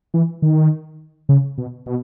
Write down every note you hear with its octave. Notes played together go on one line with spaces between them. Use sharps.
E3
D#3
C#3
B2
B2